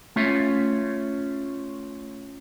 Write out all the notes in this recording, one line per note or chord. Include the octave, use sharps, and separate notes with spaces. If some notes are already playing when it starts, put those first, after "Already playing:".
A3 C#4 F4 C#5 E5